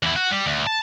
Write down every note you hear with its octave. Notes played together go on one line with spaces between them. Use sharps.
E2 E4
F#4
G3
D2
A5